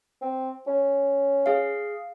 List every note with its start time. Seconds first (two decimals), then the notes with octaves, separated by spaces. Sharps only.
0.22 C4
0.67 C#4
1.46 G#4 F5